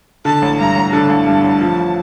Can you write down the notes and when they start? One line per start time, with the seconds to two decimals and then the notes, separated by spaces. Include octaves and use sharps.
0.25 D3 A5
0.42 A1
0.59 G2 A#5
0.76 A1
0.93 D3 A5
1.10 A1
1.26 G2
1.44 A1
1.60 F3